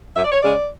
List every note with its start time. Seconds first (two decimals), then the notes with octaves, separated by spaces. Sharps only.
0.15 F#2 E5
0.24 D5
0.32 C#5
0.40 C#3 G#3 C#4 D5